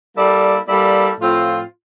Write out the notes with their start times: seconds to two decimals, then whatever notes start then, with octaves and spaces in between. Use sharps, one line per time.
0.16 G3 A#3 E4 A4 D5
0.67 G3 A#3 E4 A4 D5
1.20 A2 F3 C4 F4